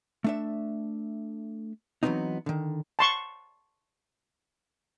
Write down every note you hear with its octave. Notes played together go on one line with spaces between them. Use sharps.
A3 D4 E5
E3 F#3 G3 B3 C4 D#4
D3 D#3
A5 C6 C#6